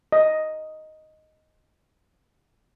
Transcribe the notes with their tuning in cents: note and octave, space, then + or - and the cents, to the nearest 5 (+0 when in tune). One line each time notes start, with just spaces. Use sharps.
D#5 +0